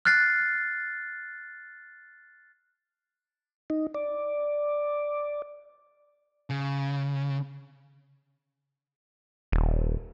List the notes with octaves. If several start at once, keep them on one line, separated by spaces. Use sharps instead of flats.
F6 F#6 A6 C7
D#4
D5
C#3
D#1